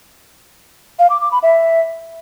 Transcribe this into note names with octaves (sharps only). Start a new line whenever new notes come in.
F5
D6
D6
B5
E5